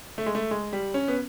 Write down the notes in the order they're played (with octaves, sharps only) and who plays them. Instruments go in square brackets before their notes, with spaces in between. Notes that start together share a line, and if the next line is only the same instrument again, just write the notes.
[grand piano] A3
G#3
A3
G#3
G3
C#4
B3